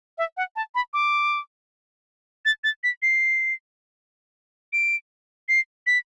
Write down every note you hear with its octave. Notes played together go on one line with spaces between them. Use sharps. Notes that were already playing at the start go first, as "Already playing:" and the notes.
E5
F#5
A5
B5
D6
A6
A6
B6
C7
D7
C7
B6